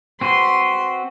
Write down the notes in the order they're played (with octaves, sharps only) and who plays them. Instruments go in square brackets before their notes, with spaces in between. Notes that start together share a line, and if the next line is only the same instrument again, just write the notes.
[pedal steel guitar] C4 F#4 B4 [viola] C6